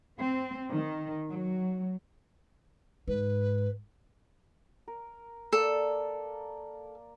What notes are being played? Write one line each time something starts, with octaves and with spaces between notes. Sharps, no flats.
C4
D#3
F#3
G#2 B4
A#4
A#3 A4 A#4 D5